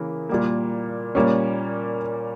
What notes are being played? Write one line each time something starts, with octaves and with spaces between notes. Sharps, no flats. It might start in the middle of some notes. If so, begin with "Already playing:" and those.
Already playing: C#3 E3 A#3
A#2 G3 A#3
A#2 G3 A#3 C#4